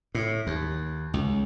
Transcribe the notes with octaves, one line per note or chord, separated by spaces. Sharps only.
A2
D#2
C#2